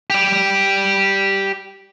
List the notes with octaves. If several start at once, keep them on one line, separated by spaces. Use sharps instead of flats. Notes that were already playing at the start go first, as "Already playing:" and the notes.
G4 D5